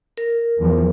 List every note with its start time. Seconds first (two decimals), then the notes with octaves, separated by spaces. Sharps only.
0.17 A#4
0.58 E2 F3